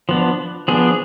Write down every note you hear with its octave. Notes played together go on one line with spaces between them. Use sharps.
F3 B3 D4
F3 B3 D4 G#4